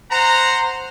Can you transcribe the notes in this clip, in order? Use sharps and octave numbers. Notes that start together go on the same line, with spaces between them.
C5 F#5 A#5